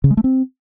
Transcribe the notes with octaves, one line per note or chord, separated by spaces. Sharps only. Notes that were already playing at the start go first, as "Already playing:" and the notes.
C#3
G#3
A3
C4